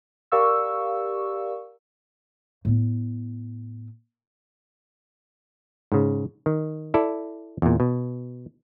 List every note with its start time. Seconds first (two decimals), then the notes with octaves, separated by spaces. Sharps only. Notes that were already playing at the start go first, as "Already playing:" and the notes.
0.32 G4 A#4 D5 F5 C#6 E6
2.65 A2 B3
5.92 G#2 C#3
6.46 D#3
6.94 E4 A4 D5
7.62 E2 A#2
7.80 B2